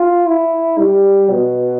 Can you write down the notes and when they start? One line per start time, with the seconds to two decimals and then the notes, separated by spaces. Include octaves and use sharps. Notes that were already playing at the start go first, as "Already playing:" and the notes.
Already playing: F4
0.26 E4
0.78 G3
1.30 B2